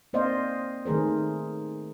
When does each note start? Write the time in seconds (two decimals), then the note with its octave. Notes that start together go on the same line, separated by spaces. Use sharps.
0.13 A#3 C4 C5 D5 D#5 F5
0.85 D#3 A3 G#4 A#4 C5